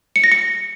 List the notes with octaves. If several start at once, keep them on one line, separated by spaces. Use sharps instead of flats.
C#7
A#6
C#7